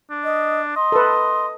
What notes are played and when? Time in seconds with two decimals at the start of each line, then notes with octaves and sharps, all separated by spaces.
0.11 D4
0.24 D#5
0.76 D#5 C6
0.92 A4 B4